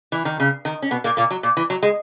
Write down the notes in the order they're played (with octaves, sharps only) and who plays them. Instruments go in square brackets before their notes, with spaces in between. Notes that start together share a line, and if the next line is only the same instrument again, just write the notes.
[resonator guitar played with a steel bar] E3
D#3
C#3
D#3
C#4
B2 B3
A#2 A#3
A#2 A#3
F#3
A#2
E3
F#3
G#3